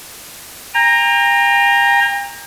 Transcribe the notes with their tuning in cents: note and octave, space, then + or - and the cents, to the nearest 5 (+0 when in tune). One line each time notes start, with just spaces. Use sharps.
G5 +40 A#5 +0